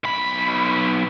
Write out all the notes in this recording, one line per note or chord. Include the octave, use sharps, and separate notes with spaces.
B1 B5